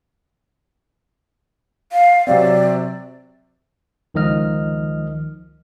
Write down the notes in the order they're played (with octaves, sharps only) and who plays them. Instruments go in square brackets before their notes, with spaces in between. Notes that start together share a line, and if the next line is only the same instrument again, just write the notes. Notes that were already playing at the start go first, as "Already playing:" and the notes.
[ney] F5
[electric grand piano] C3 F#3 C4 [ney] D5
[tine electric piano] C#2 D#3 F3 D#5 F6